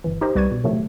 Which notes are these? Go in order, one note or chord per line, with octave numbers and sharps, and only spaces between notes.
G1 E3
D#4 G4 A#4 C5 D#5
C2 B4 D5 C#6 G#6 D#7
B2
A2 C3 D#3 F3 F#3 A3